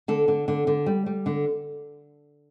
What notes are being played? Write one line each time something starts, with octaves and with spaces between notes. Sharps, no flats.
D3 A4
D3
D3
D3
G3
G3
D3